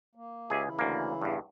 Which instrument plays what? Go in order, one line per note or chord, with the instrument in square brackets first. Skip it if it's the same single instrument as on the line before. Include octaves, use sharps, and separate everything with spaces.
[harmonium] A#3
[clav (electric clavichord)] C#2 G#4 [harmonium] G4 E5
[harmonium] C#3 E3 E4
[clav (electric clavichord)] D2 A#3
E2 G2